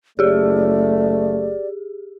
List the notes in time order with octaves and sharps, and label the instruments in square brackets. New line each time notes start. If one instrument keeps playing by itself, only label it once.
[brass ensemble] F#1 A3 [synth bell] G4 G#4 [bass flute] D5